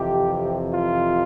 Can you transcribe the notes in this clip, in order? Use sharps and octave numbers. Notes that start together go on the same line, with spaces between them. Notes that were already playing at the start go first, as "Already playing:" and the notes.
Already playing: F2 C3 E3 G4
F4